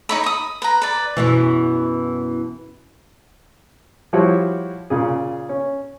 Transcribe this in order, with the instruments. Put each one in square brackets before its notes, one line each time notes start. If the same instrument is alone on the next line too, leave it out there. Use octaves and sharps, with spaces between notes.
[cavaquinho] D#4 C#5 B5
B5 D#6
B4 A#5
B4 D5
[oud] F#2 B2 E3
[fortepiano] F3 G3 E4 F#4 C5 C#5
A#2 C#3 G#4
C#4